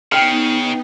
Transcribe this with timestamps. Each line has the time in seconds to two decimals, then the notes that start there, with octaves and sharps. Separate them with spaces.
0.12 C#3 B3 D#4 G5 F6